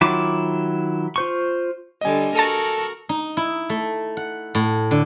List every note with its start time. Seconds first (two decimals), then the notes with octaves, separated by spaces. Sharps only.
0.01 D#3 F#3 E4 F4 D6
1.16 F4 C5 C#6
2.01 D3 G3 D#5 G#5
2.35 F#4 A4 A#4 A5 A#6 D#7
3.09 D#4
3.37 E4
3.70 A3
4.17 F#5
4.55 A2
4.91 D3